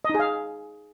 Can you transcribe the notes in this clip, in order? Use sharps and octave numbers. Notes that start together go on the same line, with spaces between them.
D#4 G#4 D#5 F5